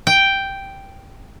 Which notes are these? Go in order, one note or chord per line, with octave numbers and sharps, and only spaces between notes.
G5